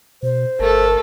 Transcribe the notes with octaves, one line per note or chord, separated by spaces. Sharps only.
B2 C5
G1 A3 A4 A#4